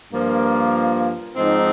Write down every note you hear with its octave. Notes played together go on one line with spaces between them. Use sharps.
G2 F3 A#3 F4
G#2 F3 C4 D#4